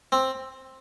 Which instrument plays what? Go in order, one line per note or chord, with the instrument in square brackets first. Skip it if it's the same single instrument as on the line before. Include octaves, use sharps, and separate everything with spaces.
[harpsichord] C4